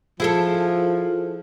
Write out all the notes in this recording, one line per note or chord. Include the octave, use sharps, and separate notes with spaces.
F3 E4 G#4 A4